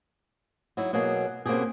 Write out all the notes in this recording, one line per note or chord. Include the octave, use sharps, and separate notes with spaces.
F#3 D#4 E4
B2 F#3 A#3 G#4
B2 A#3 C4 C#4 G4 G#4